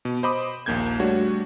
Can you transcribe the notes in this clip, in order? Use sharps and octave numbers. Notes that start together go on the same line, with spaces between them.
B2
C5 D#5 B5 D6 D#6
A#1 D#2 A#3 G6 G#6
G3 A3 D4 F#4 C#5